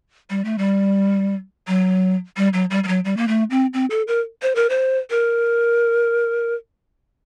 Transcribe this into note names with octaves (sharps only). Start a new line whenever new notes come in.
G3
A3
G3
F#3
G3
F#3
G3
G3
F#3
G3
A#3
A3
C4
C4
A4
A#4
C5
A#4
C5
A#4